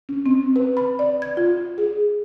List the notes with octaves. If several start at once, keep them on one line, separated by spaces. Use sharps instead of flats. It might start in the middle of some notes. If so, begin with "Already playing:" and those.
C#4
C4
B4
B5
D5
G#6
F4
G#4